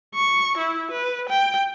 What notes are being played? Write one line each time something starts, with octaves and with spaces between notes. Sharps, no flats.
C#6
E4
B4
G5